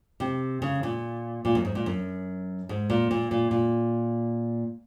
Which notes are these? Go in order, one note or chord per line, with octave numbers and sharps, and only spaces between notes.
C3
C#3
A#2
A#2
F#2
G#2
A#2
F#2
G#2
A#2
A#2
A#2
A#2